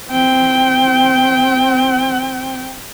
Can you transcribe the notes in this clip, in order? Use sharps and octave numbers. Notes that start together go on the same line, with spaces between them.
C4 G5